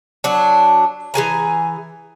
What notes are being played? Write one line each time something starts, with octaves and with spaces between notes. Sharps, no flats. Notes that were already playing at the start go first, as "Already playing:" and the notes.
F#3 D4
E3 G#4 G#5 A#5